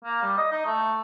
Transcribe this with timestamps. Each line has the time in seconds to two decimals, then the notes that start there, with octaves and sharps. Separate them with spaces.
0.05 A#3
0.22 G3
0.37 D#5
0.52 D#4
0.66 A3